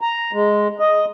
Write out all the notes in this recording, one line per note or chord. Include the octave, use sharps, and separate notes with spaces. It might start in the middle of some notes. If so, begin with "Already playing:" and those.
A#5
G#3
D#5